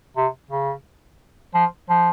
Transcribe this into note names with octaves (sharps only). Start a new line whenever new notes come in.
C3
C#3
F3
F3